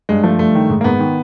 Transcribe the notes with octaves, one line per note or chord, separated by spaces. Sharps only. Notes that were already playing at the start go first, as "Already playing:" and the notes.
G2 G#3
F3 A3
G2 A3
D#3
G#2
A#3
G#2 B3
D#3